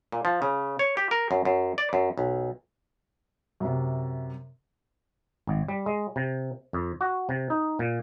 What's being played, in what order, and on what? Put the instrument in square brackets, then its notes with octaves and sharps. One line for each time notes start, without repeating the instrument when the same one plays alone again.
[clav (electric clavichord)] A#2
F3
C#3
C#5
G4
A#4
F#2
F#2
D5
F#2
B1
[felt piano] F#2 C3
[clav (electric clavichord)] G#1
G3
G#3
C3
F2
F#4
C3
D#4
A#2